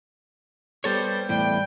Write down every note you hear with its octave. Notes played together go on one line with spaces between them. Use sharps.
G3 B3 A4 C5 C#5
E2 A2 G3 G5